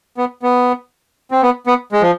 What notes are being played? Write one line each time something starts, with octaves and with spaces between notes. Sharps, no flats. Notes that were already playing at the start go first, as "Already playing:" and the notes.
B3
B3
C4
B3
B3
G#3
F3